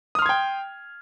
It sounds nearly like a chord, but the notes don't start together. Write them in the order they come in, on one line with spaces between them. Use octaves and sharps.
D#6 F6 C6 G#6 G5